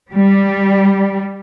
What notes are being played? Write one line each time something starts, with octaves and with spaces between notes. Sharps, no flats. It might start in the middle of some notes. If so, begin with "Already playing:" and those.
G3